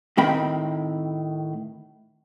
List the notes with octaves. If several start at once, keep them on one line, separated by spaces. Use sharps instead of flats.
A2 D#3 C4 G5 B5